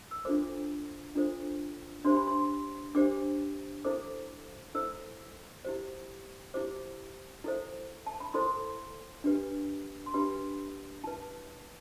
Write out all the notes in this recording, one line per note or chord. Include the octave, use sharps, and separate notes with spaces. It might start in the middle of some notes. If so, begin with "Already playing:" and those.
E6
D4 F4 A4 C5 D6
D4 F4 A4 C5
D4 G4 C5 C6
B5
C6
D4 G4 C5 D6
E4 A4 C5 D6
E4 A4 C5 E6
E4 G4 C5
E4 G4 C5 D6
E4 A4 C5
A5
B5
E4 A4 C5 C6
D4 G4 B4
C6
D4 G4 B4 B5
E4 B4 A5